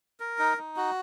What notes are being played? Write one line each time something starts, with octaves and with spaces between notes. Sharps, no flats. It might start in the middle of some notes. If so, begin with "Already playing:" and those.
A#4
D#4
D#4
F#4